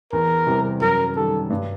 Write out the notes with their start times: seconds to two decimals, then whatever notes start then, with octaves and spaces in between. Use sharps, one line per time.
0.13 E2 A#4
0.47 C3 E3 G3
0.81 F#2 A#4
1.16 D#3 G3 A4
1.50 G2